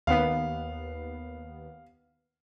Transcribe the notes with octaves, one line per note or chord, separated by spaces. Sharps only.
D#2 B3 F5